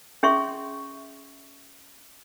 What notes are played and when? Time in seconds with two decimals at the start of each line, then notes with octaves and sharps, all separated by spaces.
0.23 C#4 G#4 E5 C6 C#6